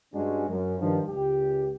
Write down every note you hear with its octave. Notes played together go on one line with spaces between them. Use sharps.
G2 G#3 C#4 D4 F#4
F#2
G2 D#3 F3
C#2 G4